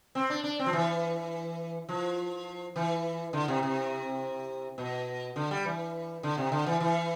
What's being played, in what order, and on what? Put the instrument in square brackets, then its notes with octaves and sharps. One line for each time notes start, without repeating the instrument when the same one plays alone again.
[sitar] C4
D4
D4
C4
F3
E3
F3
E3
D3
C3
C3
B2
D3
G3
E3
D3
C3
D3
E3
E3